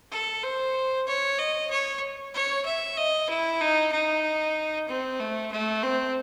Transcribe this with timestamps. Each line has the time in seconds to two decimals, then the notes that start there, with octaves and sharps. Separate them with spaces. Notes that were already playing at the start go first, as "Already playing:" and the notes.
0.12 A4
0.43 C5
1.07 C#5
1.38 D#5
1.71 C#5
2.34 C#5
2.65 E5
2.97 D#5
3.30 E4
3.61 D#4
3.92 D#4
4.88 C4
5.20 A3
5.52 A3
5.83 C4